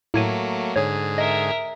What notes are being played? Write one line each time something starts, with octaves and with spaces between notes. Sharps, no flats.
A2 F#3 A3 A#3 G#6 D#7
G#2 D3 G#4 C#5
A#4 D#5 E5